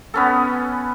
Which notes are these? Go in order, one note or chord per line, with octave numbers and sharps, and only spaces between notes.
B3 C#4 A4